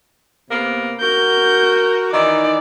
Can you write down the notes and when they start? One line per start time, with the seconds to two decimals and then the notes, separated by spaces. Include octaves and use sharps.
0.50 C3 A#3 B3
1.01 F#4 A#4 G6
2.12 D#3 E3 D#4 D5